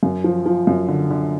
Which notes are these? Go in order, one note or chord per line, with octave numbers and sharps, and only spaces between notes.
F#2
F3
F3
F#2
D3
D3